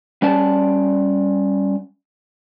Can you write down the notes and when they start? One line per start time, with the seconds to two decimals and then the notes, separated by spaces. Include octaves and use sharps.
0.22 G3 C#4 D5 A5